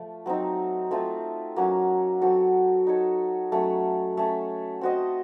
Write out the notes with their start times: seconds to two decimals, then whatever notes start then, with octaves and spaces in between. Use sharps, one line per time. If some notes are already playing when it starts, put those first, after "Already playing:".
Already playing: F3 A3 F4
0.26 F#3 C4 D#4
0.91 A3 C4 F4
1.56 F#3 A#3 C#4 F#4
2.22 F#3 C4 F#4 A4
2.87 D#4 A4 C#5
3.52 F#3 A3 C#4
4.17 A3 C#4 A4
4.81 C4 F#4 C5 D#5